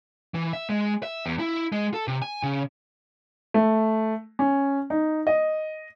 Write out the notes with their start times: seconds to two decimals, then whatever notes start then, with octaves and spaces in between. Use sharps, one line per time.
0.34 E3
0.53 E5
0.69 G#3
1.03 E5
1.26 E2
1.40 E4
1.72 G#3
1.94 A4
2.08 C3
2.22 G#5
2.43 C#3
3.54 A3
4.39 C#4
4.90 D#4
5.27 D#5